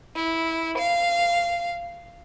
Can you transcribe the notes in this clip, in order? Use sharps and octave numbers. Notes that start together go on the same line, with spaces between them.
E4
F5